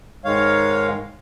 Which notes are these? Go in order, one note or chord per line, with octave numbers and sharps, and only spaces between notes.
G#2 D#3 G#3 C#5 F5